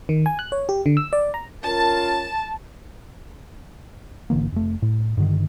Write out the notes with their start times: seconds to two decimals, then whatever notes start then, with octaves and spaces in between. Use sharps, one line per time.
0.09 D#3
0.26 G#5
0.39 F#6
0.52 C#5
0.69 G4
0.86 D3
0.97 E6
1.13 D5
1.34 A#5
1.64 C#4 F4 A#4 A5
4.30 G#1 D3 E3 A#3
4.52 F1 A3
4.82 A2
5.17 G2 D3 D#3